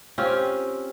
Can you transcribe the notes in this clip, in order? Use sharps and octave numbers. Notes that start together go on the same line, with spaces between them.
C4 C#4 F4 G4